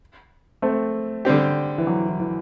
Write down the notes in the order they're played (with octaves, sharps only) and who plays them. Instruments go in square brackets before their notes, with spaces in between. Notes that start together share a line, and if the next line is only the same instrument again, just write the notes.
[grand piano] A3 C4
[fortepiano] D3 G3 C4 G4
[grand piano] E3
F#3
E3
E3